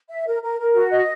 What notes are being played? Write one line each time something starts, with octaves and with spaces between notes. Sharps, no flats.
E5
A#4
A#4
A#4
F#4
D#5